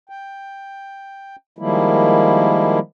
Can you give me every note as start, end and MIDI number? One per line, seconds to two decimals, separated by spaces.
0.09 1.36 79
1.59 2.79 51
1.59 2.79 53
1.59 2.79 55
1.59 2.79 56
1.59 2.79 58
1.59 2.79 64